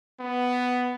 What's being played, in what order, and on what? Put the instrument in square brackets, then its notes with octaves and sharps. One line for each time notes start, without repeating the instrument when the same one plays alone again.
[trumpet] B3